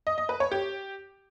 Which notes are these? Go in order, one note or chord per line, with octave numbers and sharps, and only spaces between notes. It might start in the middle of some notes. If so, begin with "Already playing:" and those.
D#5
D#5
B4
C#5
G4